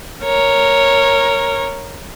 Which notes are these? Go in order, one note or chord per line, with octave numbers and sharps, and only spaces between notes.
A#4 C#5